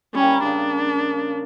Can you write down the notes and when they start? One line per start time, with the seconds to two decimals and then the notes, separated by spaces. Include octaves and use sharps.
0.14 G3 C#4
0.23 A#3
0.33 A#3
0.43 C#3 D4